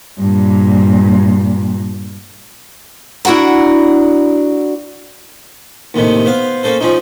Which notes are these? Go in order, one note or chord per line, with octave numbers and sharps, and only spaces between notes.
G2 A#2
D4 E4 F#4 F#5 A#5
D#2 A2 C3 D#4
B3 C5 F5
A#3 C#4 A4 C5
F3 C4 C#4 D#4